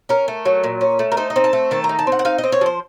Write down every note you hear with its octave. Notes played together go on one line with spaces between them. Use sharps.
C#4 A#4
A3
F#3
A#2
C#4
A3
A#4
D#4 C5
D#5
C4
A5
A3
D#3 A5
A#5
D#4
A5
C4 F#5
F#5
D#4 F5
D#5
C4
C#5
F3 C5